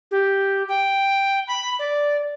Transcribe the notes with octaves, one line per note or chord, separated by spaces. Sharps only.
G4
G5
B5
D5